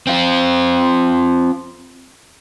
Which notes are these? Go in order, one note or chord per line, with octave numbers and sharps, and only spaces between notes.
C4 F4